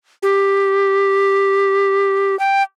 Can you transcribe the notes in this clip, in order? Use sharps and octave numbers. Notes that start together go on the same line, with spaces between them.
G4
G5